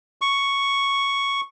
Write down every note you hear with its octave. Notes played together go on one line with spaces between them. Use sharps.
C#6